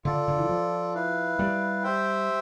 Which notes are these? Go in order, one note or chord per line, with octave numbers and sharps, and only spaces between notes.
D3 F4 A4 D5
D3
E3
F3
E4 B4 F5
G3
G4 C5 E5 G5